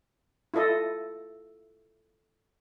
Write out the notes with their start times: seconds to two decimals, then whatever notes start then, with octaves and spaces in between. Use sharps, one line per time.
0.54 E4 F4 A4 D#5